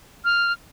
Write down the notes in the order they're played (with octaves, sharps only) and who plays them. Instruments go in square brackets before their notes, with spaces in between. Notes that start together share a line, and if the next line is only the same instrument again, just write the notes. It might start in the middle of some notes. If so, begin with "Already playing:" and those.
[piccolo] F6